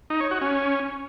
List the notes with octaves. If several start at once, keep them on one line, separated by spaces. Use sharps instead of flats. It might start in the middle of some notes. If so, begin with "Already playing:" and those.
D#4
C#5
F#4
C#4